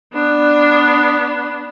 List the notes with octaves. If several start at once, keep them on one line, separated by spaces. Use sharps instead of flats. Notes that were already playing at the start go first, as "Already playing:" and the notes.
B3 D4